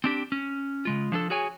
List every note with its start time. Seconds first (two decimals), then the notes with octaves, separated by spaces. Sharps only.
0.04 C4 D4 G4
0.32 C#4
0.85 C#3 G#3 F4
1.12 F3 D4 G#4 A4
1.30 F#4 G#4 C#5 G#5